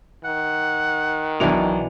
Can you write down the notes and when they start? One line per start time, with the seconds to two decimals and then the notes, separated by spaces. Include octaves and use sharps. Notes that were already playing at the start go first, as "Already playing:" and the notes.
0.25 D#3 F#5
1.40 B1 B2 E3 D4 F7